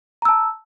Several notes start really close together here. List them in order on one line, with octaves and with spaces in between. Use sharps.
A#5 E6 A5